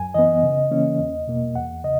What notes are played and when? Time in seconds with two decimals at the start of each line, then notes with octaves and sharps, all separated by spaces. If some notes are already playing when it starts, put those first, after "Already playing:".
Already playing: F#2 G#5
0.14 E3 B3 D#5
0.43 C#3
0.71 E3 A#3 C#4
1.00 E2
1.27 B2 A#3
1.55 E2 F#5
1.84 C#3 D#5